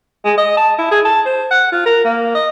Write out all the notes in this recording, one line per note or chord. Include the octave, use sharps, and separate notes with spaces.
G#3
D#5
A5
E4
G#4
A5
C5
F#5
F4
A#4
A#3
D#5